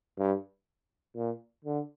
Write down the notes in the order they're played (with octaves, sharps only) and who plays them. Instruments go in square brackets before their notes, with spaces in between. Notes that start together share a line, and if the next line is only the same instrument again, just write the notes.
[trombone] G2
A#2
D3